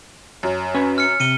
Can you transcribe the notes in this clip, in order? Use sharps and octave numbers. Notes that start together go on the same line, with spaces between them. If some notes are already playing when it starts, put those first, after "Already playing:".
F#2
C#4 B4 G#5
F6 C#7
C3 C#7 D#7 G7